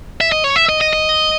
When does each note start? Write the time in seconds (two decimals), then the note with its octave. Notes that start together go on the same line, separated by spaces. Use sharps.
0.21 E5
0.32 D#5
0.44 C#5
0.56 E5
0.69 D#5
0.81 D#5
0.93 D#5